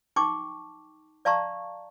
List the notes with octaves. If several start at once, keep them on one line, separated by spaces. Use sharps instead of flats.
D#4 G5 A5 C#6 D6
D5 F5 A5 A#5 C#6